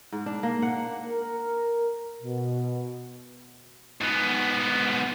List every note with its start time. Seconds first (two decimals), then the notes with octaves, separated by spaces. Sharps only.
0.12 G#2
0.26 D4
0.43 A#3
0.62 F#5
1.07 A#4
2.22 B2
4.01 G#2 B3